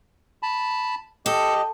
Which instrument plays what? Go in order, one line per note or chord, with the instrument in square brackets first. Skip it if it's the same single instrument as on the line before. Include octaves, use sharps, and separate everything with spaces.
[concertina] A5 B5
[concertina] G4 D#5 [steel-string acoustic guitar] A4